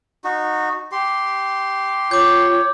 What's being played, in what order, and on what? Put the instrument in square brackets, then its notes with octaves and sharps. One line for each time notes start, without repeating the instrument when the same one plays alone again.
[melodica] D#4 F#4
G4 C6
[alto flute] F4 [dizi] C#5 [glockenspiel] D6 G6